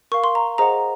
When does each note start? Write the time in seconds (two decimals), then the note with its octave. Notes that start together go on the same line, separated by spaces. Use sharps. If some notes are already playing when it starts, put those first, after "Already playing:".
0.12 A#4 F5 C#6
0.24 C6
0.35 A#5
0.58 G#4 C5 D#5 F#5 A#5